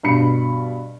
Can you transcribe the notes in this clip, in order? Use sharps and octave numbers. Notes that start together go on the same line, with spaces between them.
G2 B2 B5 C#7